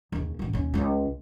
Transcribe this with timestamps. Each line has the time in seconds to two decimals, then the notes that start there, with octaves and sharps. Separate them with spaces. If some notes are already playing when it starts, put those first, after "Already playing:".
0.12 D#2 C#3
0.39 E1 A1
0.53 D#2 C#4
0.74 C#2 F4